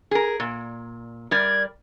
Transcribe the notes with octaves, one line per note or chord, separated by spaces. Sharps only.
G#4 A#4
A#2
G3 A#4 D5 G#6